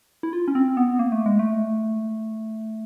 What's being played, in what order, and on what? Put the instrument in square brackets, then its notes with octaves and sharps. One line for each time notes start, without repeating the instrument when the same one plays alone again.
[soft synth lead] E4
F4
C#4
C4
B3
A#3
A3
G#3
A3